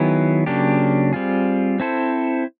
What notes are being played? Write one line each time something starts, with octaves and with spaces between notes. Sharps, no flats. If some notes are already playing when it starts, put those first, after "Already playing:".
Already playing: D#3 F#3 B3 E4 G#4
C#3 F#3 A#3 D4 G4
G3 C4 F4 G#4
C4 E4 A4 C5